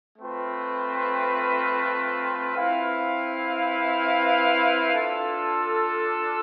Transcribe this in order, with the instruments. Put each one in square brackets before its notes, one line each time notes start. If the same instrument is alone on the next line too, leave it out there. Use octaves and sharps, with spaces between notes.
[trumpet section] A3 C4 F4 B4
C4 E4 B4 F5
D4 F4 A4